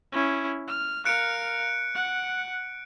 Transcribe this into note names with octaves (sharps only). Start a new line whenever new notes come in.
C#4 E4
F6
A#4 F5 F#6 C#7 D7
F#5